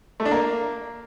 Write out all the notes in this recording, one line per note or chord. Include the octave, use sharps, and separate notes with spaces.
A3
D4
A#3